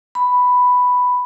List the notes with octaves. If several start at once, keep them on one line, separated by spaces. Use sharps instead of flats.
B5